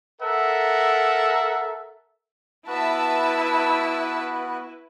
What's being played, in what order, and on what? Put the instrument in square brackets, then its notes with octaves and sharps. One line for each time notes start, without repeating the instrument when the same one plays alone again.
[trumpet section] A4 A#4 E5 F#5
[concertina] B3 F#4 [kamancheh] E4 B4 [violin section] E5 A5